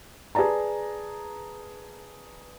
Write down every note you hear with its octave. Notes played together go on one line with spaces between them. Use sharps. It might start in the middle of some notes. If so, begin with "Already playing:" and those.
G#4 B4 D5 A5 A#5